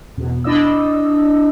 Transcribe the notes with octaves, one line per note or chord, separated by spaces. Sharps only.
E2 B2
D4 E4 D5 D#5 E6